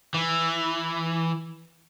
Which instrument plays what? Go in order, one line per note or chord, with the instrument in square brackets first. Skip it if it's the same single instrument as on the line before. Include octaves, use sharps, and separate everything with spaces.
[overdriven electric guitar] E3